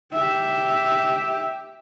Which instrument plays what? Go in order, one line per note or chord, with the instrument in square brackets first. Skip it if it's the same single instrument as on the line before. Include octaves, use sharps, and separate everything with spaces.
[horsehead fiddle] G4 E5